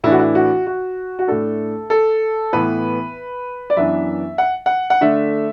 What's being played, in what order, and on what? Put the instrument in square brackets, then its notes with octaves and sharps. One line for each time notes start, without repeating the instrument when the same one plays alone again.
[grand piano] A2 E3 D4 E4
F#4
E4
F#4
F#4
F#4
A2 A3 D4 A4
A4
A2 E3 B3 B4
D5
F#2 E3 B3 D4 E5
F#5
F#5
F#5
D3 A3 D4 E5